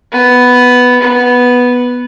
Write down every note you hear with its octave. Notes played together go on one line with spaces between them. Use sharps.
B3
B3